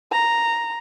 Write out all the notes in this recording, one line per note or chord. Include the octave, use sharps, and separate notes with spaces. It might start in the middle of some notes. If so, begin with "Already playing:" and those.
A#5